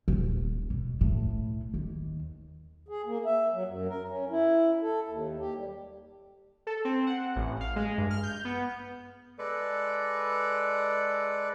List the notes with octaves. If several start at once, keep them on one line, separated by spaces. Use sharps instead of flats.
D#1
B2
A2
D#2
G#4
A#3
E5
F#3
F#2
A#4
C#4
E4
A4
D#2
G4
G3
A4
C4
F#5
A1
F5
G#3
G2
F6
G6
B3
G#3 A4 B4 D5